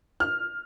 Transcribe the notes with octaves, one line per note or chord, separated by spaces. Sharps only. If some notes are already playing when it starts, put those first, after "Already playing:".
F6